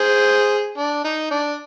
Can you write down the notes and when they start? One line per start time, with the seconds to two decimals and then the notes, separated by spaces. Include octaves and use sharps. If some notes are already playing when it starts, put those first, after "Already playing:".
Already playing: G#4 C5
0.78 D4
1.04 D#4
1.31 D4